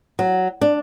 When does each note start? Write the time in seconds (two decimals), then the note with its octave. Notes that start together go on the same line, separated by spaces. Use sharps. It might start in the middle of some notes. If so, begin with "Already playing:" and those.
0.19 F#3
0.61 D4